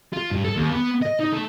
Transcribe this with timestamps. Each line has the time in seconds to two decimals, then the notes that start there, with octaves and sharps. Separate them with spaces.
0.13 F4
0.31 G2
0.44 A4
0.56 D#2
0.71 B3
1.02 D#5
1.20 D#4
1.33 A3